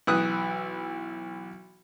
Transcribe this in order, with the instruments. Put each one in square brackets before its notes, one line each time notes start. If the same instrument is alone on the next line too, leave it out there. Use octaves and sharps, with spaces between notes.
[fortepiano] B1 E3 E4 D#6 F#6